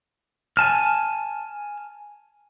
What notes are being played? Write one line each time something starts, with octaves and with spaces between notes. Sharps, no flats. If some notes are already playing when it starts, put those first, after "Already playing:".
G#5 A5 F6